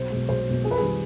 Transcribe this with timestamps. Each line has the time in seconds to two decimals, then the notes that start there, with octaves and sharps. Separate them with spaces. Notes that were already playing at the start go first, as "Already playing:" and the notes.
Already playing: B1 C5
0.10 B2 G#3
0.29 B1 C5
0.47 B2 G#3
0.64 F2 G#4
0.71 B4
0.78 D#3 G3 G#4